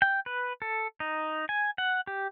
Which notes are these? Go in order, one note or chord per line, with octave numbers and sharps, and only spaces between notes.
G5
B4
A4
D#4
G#5
F#5
G4